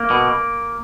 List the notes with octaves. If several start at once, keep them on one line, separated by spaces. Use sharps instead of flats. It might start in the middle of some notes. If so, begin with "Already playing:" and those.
Already playing: A#3
B2